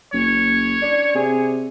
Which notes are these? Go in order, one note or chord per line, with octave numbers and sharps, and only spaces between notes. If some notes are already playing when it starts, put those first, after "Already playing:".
F#1 C#5
D4
C3 G#4